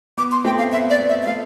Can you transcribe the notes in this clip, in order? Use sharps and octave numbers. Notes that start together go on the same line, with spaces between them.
B3 D6
C6
A3 C4 G5
F5
B3 E5
D5
B3
E5
E5
A3 F5